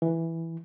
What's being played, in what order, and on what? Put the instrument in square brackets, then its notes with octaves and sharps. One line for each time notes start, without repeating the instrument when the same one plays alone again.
[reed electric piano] E3